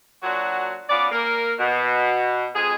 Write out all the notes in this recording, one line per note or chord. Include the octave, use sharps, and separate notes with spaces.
A#2 F#3 D4 F#4 F#5
B3 C#4 F4 D5
A#3 A#4
B2
F2 G#3 G#4